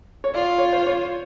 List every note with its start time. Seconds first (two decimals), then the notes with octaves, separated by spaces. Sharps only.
0.24 C#5
0.34 F4 D5
0.58 C#5
0.73 C5
0.87 C#5